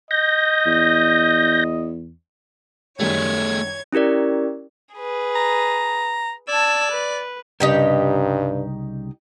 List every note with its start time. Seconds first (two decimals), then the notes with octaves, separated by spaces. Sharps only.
0.11 D#5 G6 A#6
0.66 E2
3.00 F#2 D#3 G3 A3 G#4 C#5 G#6
3.93 C#4 E4 G4 A#4 D5
4.94 G#4 B4
5.35 A#5
6.48 D5 A5 E6 G#6
6.92 B4
7.60 C2 G2 C#3 D#4 G4 A#4 G5